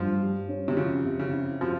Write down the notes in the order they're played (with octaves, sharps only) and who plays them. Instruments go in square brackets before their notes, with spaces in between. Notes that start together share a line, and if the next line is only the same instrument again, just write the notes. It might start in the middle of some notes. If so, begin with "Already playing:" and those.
Already playing: [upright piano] G2 [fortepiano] F3
[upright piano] G3
C#4
[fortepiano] C3
[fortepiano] C#3 [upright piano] F3
[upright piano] C3
[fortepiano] C#3
[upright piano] E4
[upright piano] C3 [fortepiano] F3